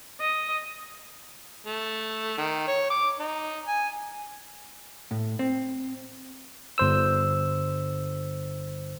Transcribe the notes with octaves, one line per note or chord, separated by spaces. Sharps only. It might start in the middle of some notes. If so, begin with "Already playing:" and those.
D#5
A3
D#3
C#5
D6
D#4
G#5
A2
C4
G1 C5 E6